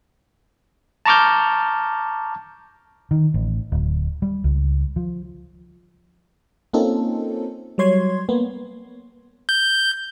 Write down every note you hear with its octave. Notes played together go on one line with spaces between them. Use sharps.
A5 A#5 C#6 D6 F6 G6
D#3
A1
D1
G3
C#2
F3
A#3 C4 C#4 D#4 F4 A4
F#3 G3 C#5 C6 G#6
A#3 B3
G6